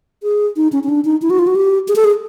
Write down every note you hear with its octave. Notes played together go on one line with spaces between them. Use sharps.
G#4
D#4
C#4
C#4
D4
D#4
E4
F#4
F4
F#4
G4
G#4
A4
G#4